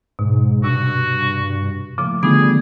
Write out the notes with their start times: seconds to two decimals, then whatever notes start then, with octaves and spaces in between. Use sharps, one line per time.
0.19 G#2 B2
0.64 G2 C3 F#4
1.98 A2 C#3 F3 A#3 D6
2.23 D3 D#3 G3 A3 B3 F4 G#4